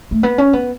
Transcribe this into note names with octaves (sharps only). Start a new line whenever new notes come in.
A3
B3
C#4
B3